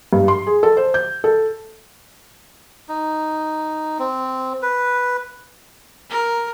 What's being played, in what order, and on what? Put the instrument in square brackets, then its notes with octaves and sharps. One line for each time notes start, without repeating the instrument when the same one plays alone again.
[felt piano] G2
C6
G#4
A4
C5
G6
A4
[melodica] D#4
C4
B4
[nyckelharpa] A#4